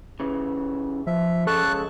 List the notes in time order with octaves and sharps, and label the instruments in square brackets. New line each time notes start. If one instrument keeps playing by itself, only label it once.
[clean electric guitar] C#3 E3
[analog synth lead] F3 [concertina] E5
[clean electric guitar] C#2 G#3 [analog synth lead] A4 [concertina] A5 C#6 F#6